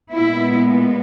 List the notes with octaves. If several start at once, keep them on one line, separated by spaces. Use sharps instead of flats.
A#2 G#3 B3 E4